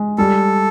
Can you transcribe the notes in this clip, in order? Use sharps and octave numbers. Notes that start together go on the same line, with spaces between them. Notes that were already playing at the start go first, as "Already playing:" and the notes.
Already playing: G#3
G3 A4